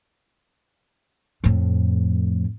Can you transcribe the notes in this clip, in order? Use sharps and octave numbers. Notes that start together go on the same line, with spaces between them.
F2 A2